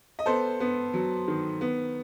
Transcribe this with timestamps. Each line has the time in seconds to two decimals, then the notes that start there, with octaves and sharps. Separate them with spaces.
0.19 D#5
0.26 B3 A4 C5
0.60 B3
0.94 F#3
1.28 D#3
1.61 B3